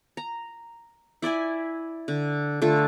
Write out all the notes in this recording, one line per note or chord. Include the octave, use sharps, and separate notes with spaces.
A#5
E4 D5 E5 G#5
D3
D3 A3 F4 A4